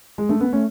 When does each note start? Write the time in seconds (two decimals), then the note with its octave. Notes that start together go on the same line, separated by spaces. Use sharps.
0.18 G#3
0.29 A3 D4
0.40 B3 C#4
0.52 A3 C#4